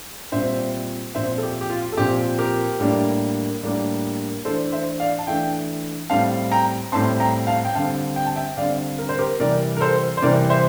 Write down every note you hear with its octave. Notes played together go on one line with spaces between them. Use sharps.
A#2 G3 C4 C5 E5
A#2 F3 C4 C5 E5
A4
G4
G4
F4
A4
A#2 F3 C4 G4
G4 A#4
A2 G3 A#3 D4
A2 G3 A#3 D4
E3 A3 D4 A4 C5
C5 E5
D5 F5
A5
E3 A3 D4 E5 G5
A2 G3 C4 F5 A5
G5 A#5
A2 G3 C4 A5 C6
G5 A#5
F5 A5
G5
D3 G3 C4 F5 A5
G5
A5
E5 G5
D3 G3 C4 D5 F5
A#4
C5
G4 A#4
C3 E3 G3 A#4 D5
A#4
A4 C5
C5
C3 E3 G3 A#4 D5
C5 E5